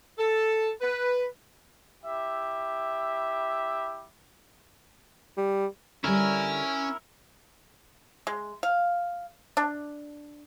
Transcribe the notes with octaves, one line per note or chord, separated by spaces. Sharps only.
A4
B4
E4 G4 E5
G3
D3 G3 C#4 E4 A#4 G#5
G#3
F5
D4